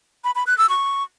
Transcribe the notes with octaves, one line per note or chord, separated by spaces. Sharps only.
B5
B5
F#6
E6
C#6